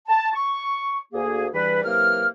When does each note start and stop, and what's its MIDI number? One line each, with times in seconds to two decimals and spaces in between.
0.08 0.30 81
0.34 0.97 85
1.13 1.48 38
1.13 1.48 58
1.13 1.48 68
1.53 1.81 40
1.53 1.81 43
1.53 1.81 52
1.53 1.81 55
1.53 1.81 71
1.84 2.26 48
1.84 2.26 52
1.84 2.26 54
1.84 2.26 58
1.84 2.26 70
1.84 2.26 89